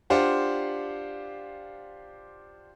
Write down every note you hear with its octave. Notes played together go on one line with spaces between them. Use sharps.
D4 F4 G4 C5 F5 F#5